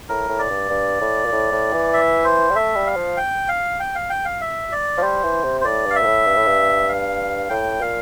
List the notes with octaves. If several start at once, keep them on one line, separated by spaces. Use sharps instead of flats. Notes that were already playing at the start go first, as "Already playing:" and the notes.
A2 A#4
A2
D5
G2
G2
A2
A#2
A2
A2
E3
E5
C5
G3
A3 E5
G3
F5
F3
G5
F5
G5
F5
G5
F5
E5
D5
F3
G3 C5
E3
C3
C5
A2 D5
G2 F5
E5
A#2
A2
G2
A2
G2
F5
A2 G5
A#2 F5